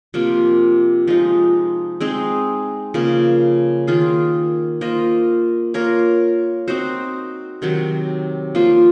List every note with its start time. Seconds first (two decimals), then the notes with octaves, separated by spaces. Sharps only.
0.14 C3 F3 A#3 F4
1.07 F3 G#3 D#4
2.01 G#3 C4 D#4 G#4
2.94 C#3 F3 A#3
3.87 D#3 A#3 F4 G#4
4.81 A#3 F4 C5 D#5
5.74 A#3 F4 A#4 C#5
6.68 C4 D#4 F#4 C5
7.62 C3 D#3 F#3
8.55 F3 A#3 F4 C5